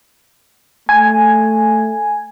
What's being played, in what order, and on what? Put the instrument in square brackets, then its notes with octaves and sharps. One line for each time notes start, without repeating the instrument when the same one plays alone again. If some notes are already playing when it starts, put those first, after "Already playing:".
[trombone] A3 [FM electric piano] G#5